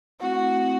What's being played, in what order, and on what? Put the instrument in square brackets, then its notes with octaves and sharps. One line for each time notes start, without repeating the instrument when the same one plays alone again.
[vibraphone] A3 C4 E4 [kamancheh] F#4
[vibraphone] A3 C4 E4